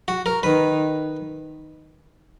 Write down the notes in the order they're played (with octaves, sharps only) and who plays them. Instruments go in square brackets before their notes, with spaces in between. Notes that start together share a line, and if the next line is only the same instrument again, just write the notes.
[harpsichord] F#4
A#4
[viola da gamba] D#3 [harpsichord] B4